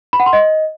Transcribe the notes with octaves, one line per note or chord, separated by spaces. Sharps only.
B5
F#5
C6
D#5